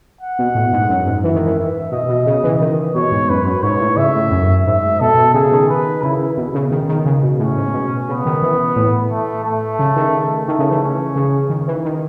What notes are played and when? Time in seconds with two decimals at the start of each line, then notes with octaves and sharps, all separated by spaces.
0.21 F#5
0.39 B2
0.55 A2
0.73 G#2
0.90 F#2
1.06 G#2
1.24 E3 E5
1.35 D#3
1.47 E3
1.58 E5
1.92 B2 D#5
2.09 B2
2.26 C#3
2.44 E3
2.61 D#3
2.95 B2 C#5
3.12 G#2
3.29 F#2 B4
3.46 F#2
3.63 G#2 C#5
3.81 A2
3.97 C#3 E5
4.15 A2
4.31 F#2
4.66 G#2 E5
5.00 B2 A4
5.18 B2
5.34 C#3 G#4
5.52 D#3
5.69 B4
6.03 C#3 E4
6.37 B2
6.55 C#3
6.71 D#3
6.89 D#3
7.06 C#3
7.23 B2
7.39 A2 C#4
7.57 G#2
7.74 B2
8.08 C#3 B3
8.25 D#3
8.42 E3
8.76 A2
9.10 A3
9.44 A3
9.79 C#3
9.96 D#3
10.47 D#3 A3
10.59 C#3
10.71 E3
10.82 C#4
11.16 C#3
11.50 D#3
11.68 E3
11.85 D#3